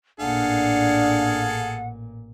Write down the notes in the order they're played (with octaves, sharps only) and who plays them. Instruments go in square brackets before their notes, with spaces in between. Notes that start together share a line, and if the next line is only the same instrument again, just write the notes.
[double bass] A1 A#2 [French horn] D4 [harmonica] G#4 A4 F5 [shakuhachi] F#5